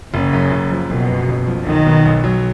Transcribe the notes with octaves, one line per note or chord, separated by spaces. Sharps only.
F#1 C#3
F#2
F#1
F3
F#1 B2
F#2
F#1
F3
B1 D#3
B2
B1
F#3